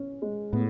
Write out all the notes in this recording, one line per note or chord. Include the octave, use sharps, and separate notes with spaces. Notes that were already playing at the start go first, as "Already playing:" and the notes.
Already playing: C#4
G#3
A2 B3